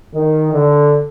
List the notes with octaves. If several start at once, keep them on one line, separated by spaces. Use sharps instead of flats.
D#3
D3